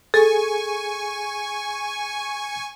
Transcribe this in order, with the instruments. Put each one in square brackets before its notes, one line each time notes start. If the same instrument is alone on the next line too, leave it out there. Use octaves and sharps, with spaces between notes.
[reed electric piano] G#4 [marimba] A4 [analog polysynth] G#5 C#6